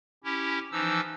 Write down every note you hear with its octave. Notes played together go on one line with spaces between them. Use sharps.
C#4 E4 G4
E3 F3 D#4 E6